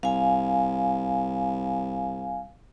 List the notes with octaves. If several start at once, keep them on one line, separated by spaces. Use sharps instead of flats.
C2 F5 G#5